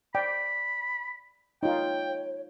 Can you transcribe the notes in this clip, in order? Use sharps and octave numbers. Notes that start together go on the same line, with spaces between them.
D5 G5 B5
D#4 F4 C#5 G5